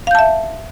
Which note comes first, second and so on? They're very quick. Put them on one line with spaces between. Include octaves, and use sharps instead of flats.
F5 G6 A5 E5